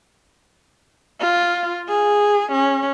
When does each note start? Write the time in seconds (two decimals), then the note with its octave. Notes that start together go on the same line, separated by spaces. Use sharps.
1.21 F4
1.88 G#4
2.52 C#4